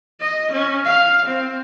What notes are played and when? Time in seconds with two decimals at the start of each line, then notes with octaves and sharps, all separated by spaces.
0.20 D#5
0.52 C#4
0.85 F5
1.26 C4